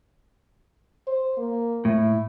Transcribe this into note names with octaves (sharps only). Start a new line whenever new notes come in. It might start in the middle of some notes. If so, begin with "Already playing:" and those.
C5
A#3
A2 E4